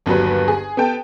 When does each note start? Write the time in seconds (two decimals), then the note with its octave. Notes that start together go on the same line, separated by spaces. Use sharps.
0.06 G1 D#2 F#3 B4
0.48 G#4
0.77 B3 A4 G5 A5